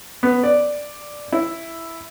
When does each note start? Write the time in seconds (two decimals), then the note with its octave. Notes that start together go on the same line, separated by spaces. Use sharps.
0.23 B3
0.43 D5
1.32 E4